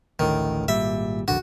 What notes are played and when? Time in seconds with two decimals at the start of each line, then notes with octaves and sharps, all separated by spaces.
0.19 A1 D2 A2 D#3
0.68 G#1 A#2 G3 E5
1.28 E1 A#1 D3 F#4